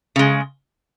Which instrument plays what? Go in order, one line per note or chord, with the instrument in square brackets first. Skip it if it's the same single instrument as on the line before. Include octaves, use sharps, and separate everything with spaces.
[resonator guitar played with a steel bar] C#3 G#3